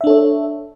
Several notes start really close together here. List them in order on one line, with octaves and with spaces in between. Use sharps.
E5 D4 A4 C#5